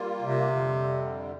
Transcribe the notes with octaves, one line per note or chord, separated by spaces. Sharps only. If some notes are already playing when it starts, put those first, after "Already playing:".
Already playing: G3 A#3 F4
C3
F2 D3 G3